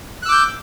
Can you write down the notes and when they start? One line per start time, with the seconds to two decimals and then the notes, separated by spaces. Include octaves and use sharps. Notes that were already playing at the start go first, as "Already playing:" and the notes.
0.22 F#6
0.26 E6
0.29 D6
0.32 G6